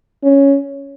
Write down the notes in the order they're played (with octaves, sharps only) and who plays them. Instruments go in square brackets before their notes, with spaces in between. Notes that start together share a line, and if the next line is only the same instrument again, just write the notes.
[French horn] C#4